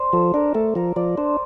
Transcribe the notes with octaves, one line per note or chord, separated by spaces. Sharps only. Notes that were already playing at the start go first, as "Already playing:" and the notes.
Already playing: C5 D5
F3 A4
D4 A#4
A3 A4
F3 A#4
F3 D5
D4 C5